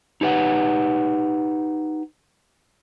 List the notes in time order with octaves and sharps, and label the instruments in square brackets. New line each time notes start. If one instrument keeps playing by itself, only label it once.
[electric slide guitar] D#4 G4 B4 F#5